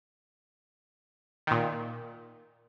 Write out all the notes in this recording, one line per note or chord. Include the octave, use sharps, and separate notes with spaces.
A#2 D#3